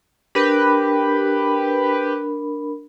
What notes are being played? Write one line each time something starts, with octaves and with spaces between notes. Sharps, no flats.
D4 G4 A#4 B4 B5